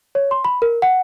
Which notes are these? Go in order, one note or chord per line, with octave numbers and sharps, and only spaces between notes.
C#5
C6
B5
A#4
F#5